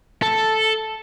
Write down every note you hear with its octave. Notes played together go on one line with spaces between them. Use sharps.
A4